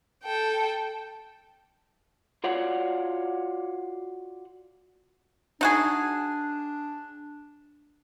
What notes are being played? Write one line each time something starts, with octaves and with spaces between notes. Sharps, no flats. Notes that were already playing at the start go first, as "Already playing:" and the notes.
A4 G5
F4 F#4 C#5 D5 F5 F#5
D4 D#4 F#4 G#4